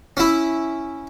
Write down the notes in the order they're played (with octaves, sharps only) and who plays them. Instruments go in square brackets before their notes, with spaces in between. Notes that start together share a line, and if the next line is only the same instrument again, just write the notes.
[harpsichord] C#4 E4